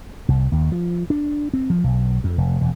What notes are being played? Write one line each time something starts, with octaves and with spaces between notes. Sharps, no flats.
C2
D#2
F3
D4
C4
F3
B1
F2
F1
E1